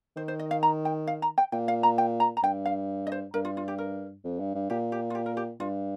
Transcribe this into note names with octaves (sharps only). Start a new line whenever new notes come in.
D#3 C5
C5
D#5
F5
A#5
G5
F5
A#5
G5
A#2 G5
F5
A#5
G5
A#5
A#5
G2 G5
F5
D#5
C5
G2 A#4
F4
F4
G4
A#4
F2
G2
G2
A#2 G4
G4
F4
G4
A#4
G4
G2 F4